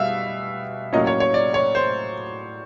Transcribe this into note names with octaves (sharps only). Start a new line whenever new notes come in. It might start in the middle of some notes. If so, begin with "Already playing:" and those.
Already playing: B2 G3 E5 F5
A2 F#3 A#3 C#4 D#5
C#5
C#5
D5
C#5
C5